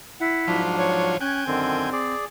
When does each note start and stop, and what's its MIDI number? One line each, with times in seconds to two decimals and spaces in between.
0.20 0.61 64
0.20 0.46 78
0.47 1.15 44
0.47 1.17 53
0.47 1.17 54
0.47 1.15 62
0.47 1.17 65
0.78 1.17 73
1.21 1.47 61
1.21 1.90 79
1.21 1.90 80
1.21 1.44 90
1.47 1.90 42
1.47 1.90 50
1.47 1.90 51
1.47 2.14 60
1.92 2.25 68
1.92 2.25 74